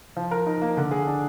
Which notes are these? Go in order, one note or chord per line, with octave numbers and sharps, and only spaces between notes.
F3
A#4
D#4
A#3
D3
G#4
D4